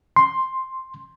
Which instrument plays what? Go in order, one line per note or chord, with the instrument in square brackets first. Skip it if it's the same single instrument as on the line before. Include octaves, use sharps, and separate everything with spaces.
[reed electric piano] C6